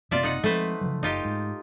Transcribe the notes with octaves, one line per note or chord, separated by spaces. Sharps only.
F#1 C3 A#3 F4 D5 E5
D#4 F#5
F3 G#3 A3 C4 B4 C5
C#3 F3 F#3
F#1 D#4 F4 G4
G#2